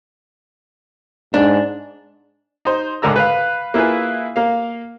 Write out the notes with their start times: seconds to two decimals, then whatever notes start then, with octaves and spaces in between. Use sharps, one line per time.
1.34 G#2 D4
2.65 D#4 C5
3.02 C#2 G#2 D3 A#4 A#5 E6
3.16 B4 F5
3.74 A#3 E4 F4 G#4 B4
4.36 A#3 F5